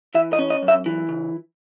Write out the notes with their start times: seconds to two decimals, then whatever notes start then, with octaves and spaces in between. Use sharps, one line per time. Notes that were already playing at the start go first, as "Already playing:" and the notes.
0.15 E3 E5
0.33 D#5
0.39 C#4
0.50 D#5
0.63 F#2
0.68 E5
0.86 E3
1.09 C#3